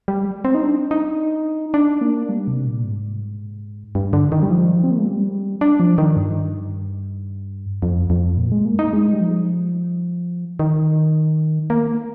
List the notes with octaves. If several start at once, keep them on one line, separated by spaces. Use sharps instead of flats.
G3
C4
D#4
D4
D#4
D4
A#3
G3
C3
A#2
G#2
G2
D3
D#3
G3
F3
C4
A#3
G#3
G3
D4
F3
D#3
G2
F2
F2
A#2
G#3
A#3
D#4
G#3
G3
F3
D#3
A#3